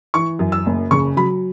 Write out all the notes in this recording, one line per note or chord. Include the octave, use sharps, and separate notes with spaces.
E3 C#6
F#2
E6
F#1
C#3 C#6
F#3 B5